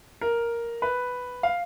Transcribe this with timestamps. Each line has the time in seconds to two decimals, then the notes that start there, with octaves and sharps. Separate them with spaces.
0.21 A#4
0.82 B4
1.43 F5